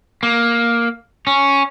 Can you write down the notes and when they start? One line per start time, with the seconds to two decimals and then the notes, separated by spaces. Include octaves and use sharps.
0.23 A#3
1.27 C#4